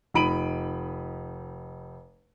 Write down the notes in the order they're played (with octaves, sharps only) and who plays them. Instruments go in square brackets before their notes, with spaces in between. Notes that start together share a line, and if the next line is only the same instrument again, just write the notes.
[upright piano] F1 D#4 B5 D7 D#7 F#7